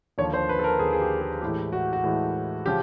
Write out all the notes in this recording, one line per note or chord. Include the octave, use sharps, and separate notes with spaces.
D#2 D3 F3 C#5
C5
B4
A4
A#4
D#2 D3 F3 G#4
G#4
G4
G#4
A2 E3 G#3 G4
F#4
F#4
A2 E3 G#3
C#3 F3 G4